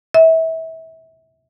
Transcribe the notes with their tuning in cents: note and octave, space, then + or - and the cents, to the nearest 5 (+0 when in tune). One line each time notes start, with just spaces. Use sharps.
E5 -30